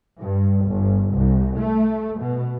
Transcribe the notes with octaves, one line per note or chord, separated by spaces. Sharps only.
G2
G1
C2
A3
B2